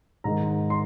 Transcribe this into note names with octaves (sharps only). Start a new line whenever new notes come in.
G#2 D#3 G#3 A#5
C6